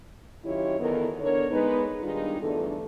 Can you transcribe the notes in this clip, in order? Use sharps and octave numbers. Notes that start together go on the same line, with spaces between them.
F#2 D#3 E4 F4 G4 C#5
E2 D#3 B3 A4 A#4
D3 B3 D4 A#4 C#5
G#3 B3 D#4 B4
D#3 G3 D4 D#4 F4 G#4
E2 G2 D3 A3 A4